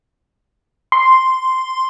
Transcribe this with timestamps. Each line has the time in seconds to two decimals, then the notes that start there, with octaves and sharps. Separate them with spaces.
0.92 C6